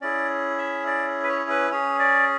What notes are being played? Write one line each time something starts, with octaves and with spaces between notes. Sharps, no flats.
C#4 E4 G#4 D5
E5
D5
B4
C#5
B4
C#4 G#4 C#5
D5